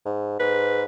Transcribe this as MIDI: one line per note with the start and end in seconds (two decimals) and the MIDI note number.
0.05 0.39 44
0.40 0.85 44
0.40 0.83 71